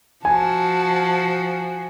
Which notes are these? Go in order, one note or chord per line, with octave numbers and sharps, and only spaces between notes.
F3 F#4 G#5 A5